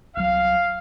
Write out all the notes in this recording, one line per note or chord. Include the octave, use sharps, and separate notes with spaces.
C2 F#3 F5